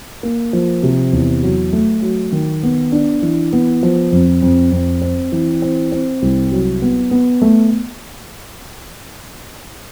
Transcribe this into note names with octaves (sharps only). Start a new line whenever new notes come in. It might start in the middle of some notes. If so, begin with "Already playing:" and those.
A#3
F3
C3
E2
F#3
A3
F#3
D#3
B3
D4
E3
B3
F3
F2
F2
F2
C4
E3
C4
C4
C2
F#3
B3
B3
A3